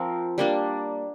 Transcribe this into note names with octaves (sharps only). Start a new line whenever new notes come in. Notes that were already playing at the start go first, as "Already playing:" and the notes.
Already playing: F3 C4 A#4
G3 A#3 D4